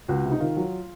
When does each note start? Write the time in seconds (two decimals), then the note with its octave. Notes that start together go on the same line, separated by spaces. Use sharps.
0.08 C#2 F#4
0.24 C3
0.32 D#4
0.40 D#3 F4
0.57 F#3